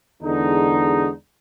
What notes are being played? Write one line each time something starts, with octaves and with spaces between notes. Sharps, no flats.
E2 D3 G#3 D#4